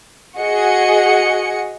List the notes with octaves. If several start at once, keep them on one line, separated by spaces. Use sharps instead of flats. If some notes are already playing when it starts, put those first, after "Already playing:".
F#4 G#4 D#5 C#7